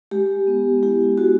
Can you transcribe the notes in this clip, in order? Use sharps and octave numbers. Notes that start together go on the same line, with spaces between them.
G#3 G4
B3
E4 G4
G#3 F#4